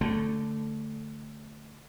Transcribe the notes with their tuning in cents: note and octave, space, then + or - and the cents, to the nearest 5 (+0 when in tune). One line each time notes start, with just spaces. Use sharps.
D3 -10 A3 +0